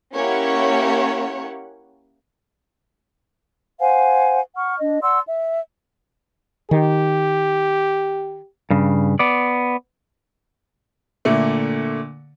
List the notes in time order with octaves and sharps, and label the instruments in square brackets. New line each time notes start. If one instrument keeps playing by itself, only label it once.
[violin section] A#3 C#4 E4 G4 C#5 F#5
[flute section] C5 F5 F#5 G#5
F#5 C#6 F6
D4 D#5
D5 F#5 C6 E6
E5
[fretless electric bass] D#3 [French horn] G4
[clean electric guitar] G2 C#3
B3 D5
[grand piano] A#2 D3 A3